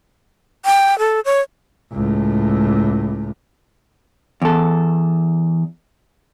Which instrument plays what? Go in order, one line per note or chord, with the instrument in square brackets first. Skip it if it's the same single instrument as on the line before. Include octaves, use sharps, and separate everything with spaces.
[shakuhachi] G5
A4
C#5
[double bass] C#2 A2
[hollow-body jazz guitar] E2 A4